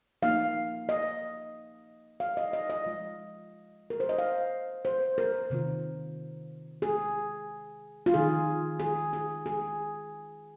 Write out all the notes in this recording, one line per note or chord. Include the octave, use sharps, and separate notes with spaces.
F3 A#3 D#4 F5
D#5
F5
D#5
D#5
D#5
F3 G#3 F4
A#4
C5
D#5
F5
C5
A#4
C3 D#3 C4 F4
G#4
F4
D#3 C4 D#4 G#4
G#4
G#4
G#4